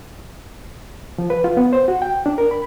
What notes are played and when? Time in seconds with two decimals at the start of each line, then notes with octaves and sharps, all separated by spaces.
1.18 F3
1.30 B4
1.44 F4
1.57 B3
1.73 C5
1.88 F#4
2.02 G5
2.26 D4
2.38 A#4
2.51 B5